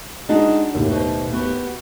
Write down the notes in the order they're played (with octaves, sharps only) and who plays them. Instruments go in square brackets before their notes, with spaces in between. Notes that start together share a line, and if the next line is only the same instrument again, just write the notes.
[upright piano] G#3 D#4 [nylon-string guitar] D4 F4 F#4
[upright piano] D#2 A2
[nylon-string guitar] B2 C5
B3 F#4 G4